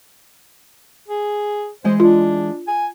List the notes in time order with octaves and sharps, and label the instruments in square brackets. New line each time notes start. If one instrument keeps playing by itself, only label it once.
[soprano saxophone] G#4
[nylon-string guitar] E3 G#3 D#5 [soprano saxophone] C5
[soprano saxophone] D4 [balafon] F4
[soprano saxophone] G#5